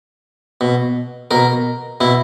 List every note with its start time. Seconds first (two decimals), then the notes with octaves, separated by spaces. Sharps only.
0.61 B2
1.31 B2 A#4
2.01 B2 E4